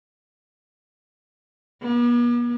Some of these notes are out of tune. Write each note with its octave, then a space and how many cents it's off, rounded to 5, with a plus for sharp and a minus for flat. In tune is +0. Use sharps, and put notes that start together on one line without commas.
B3 -45